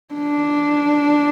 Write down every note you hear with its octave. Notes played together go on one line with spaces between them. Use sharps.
D4